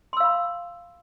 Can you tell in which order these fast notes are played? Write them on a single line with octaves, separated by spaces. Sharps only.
C6 E6 F5 B5